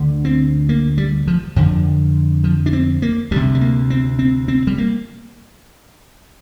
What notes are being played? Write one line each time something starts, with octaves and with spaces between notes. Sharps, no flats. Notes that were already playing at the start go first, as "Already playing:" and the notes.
Already playing: D2 D3
C4
A#3
G3
F3
F2 D3 F3
F3
D4
C4
A#3
D2 C3 G3
G3
A#3
C4
C4
C4
G3
A#3